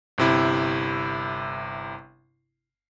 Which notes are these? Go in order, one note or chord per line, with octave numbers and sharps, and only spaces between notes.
G1 C3 E4